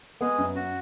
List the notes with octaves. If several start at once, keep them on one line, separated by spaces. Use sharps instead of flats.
G#3 B3 G#4
F#2
F#2 F#4